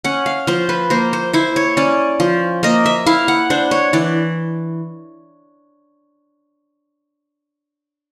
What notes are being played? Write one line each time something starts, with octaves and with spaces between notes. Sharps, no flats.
C#4 F#5
F5
F3 C5
B4
A#3 C5
C5
E4 C5
C#5
C#4 D5
F3
A#3 D#5
E5
E4 F5
F#5
D4 C5
C#5
E3 D5